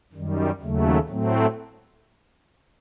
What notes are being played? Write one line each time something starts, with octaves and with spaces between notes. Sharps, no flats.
F#2 D#3 G3
D#2 C#3 F#3 A3
A2 F#3 A3 C4